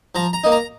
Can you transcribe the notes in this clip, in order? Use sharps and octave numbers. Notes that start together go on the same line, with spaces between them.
F3 A#5
A#5
A#3 D#4
A#5